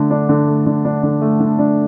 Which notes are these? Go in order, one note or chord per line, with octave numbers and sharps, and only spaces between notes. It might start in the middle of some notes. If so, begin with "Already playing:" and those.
Already playing: D3 A3
D4
D3
A3
D3
D4
D3
A3
D3
D4